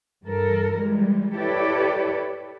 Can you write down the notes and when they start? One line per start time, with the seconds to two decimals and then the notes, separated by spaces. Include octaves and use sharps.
0.23 G2 E3 A4 A#4
0.77 E3 G3 G#3
1.37 E4 G4 A4 B4 C#5 D5